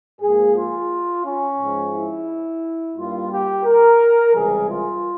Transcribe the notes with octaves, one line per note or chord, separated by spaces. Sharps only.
G#2 F3 A#3 G#4
F4
C#4
G#2 F3 G#3
E4
G2 G3 A#3 F4
G4
A#4
C#2 C3 E3 G3 G#4
F4